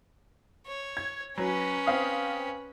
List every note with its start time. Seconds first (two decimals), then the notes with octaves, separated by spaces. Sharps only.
0.66 C#5
0.97 G#6
1.38 F#3 C#4 B4
1.86 C4 F5 D#6